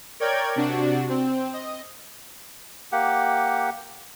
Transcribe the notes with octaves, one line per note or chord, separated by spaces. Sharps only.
A#4 C#5 D5 G5 G#6
C3 D4 F#4
C4
D#5
A#3 G4 F#5